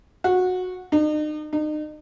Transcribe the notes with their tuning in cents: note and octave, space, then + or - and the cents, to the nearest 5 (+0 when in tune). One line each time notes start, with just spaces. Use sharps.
F#4 -15
D#4 -40
D#4 -35